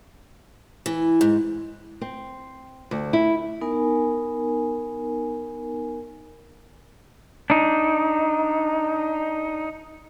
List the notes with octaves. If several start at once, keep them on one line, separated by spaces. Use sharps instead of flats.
E3
G#2
C4
D2
E4
B3 D#4 A#4 G#5
D4 D#4